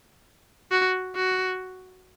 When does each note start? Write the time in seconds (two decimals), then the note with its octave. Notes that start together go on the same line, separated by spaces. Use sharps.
0.71 F#4
1.16 F#4